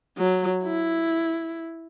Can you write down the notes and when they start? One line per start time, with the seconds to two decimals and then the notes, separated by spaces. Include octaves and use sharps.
0.18 F#3
0.64 E4